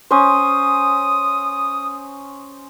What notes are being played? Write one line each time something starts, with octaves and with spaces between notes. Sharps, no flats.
C#4 C5 D#6